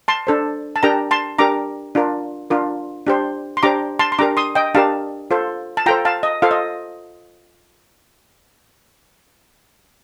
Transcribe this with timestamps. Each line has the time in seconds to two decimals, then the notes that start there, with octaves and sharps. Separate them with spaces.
0.08 A5 C6
0.27 D4 A4 C5
0.76 A5
0.83 D4 G4 A#4 G5 A#5
1.11 A5 C6
1.39 D4 G4 A#4 A#5 D6
1.95 D4 F4 A#4
2.50 D4 F4 A#4
3.06 D4 G4 C5
3.57 C6
3.63 D4 G4 C5 A#5 D6
3.99 A5 C6
4.12 C6
4.19 D4 G4 A#4 A#5 D6
4.37 C6 D#6
4.55 D#5 G5
4.75 D4 G4 A#4 F5 A5
5.31 F4 A4 C5
5.77 A5
5.86 F4 A4 C5 G5 A#5
6.05 F5 A5
6.23 D#5
6.42 F4 A4 C5 F5
6.51 D#5